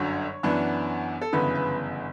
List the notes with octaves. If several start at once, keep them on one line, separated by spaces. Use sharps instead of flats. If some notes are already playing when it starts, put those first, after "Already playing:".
Already playing: G1 F#2 D3 F#3 C#5
F#2 E3 B3 D4
A4
G1 F#2 C#3 E3 B3 B4
B4